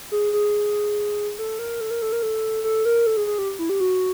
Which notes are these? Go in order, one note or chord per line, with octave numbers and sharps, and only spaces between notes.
G#4
G#4
A4
A#4
A4
A#4
A4
A#4
A4
A4
A#4
A4
G#4
G#4
G4
E4
G4
F#4